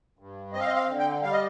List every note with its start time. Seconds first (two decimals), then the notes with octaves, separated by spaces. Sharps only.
0.19 G2
0.53 C4 D#5
0.60 F5
0.67 D#5
0.76 F5
0.87 D3
0.99 G5
1.22 G3 F5
1.32 D#5